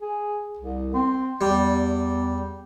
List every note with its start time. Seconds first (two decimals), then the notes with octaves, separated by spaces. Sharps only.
0.01 G#4
0.59 C2
0.94 C4
1.41 E2 G3